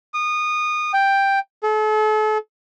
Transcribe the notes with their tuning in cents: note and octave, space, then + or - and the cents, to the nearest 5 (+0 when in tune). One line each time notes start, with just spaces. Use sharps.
D#6 -25
G5 +5
A4 -40